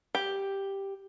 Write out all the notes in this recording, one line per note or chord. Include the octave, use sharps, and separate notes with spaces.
G4